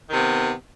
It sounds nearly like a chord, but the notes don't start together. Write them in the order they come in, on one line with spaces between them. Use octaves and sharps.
D#3 C3 B3